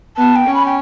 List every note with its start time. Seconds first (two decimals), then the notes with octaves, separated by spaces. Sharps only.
0.17 B3 A5
0.36 G5
0.46 C#4
0.55 B5
0.66 G5